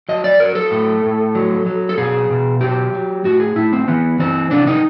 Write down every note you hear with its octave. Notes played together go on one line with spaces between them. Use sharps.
F#3 D#5
D5
F#3 A#4
A4
A2
A2
F#3
F#3
A4
B2 G#4
B2
F#3 G4
F#3
A2 F#4
G#4
A2 E4
C4
E3 B3
E3 C4
C3 D4
D#4